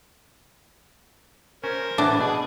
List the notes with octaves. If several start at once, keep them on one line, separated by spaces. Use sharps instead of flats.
C#4 A#4 C5
A2 E3 B3 D4
B2 G#4 D5